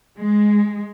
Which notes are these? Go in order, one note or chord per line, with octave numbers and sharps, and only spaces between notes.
G#3